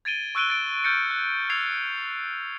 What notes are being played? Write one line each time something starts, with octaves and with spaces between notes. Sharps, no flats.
G#6 A6 D7 D#7 G7
C#6 E6 F#6 D7 D#7 G7
A6 D7
F6 G6 A6 C#7
F#6
E6 G#6 C7 F7